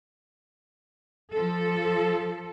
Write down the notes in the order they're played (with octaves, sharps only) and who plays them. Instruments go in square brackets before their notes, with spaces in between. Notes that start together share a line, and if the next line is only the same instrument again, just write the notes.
[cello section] F3 A4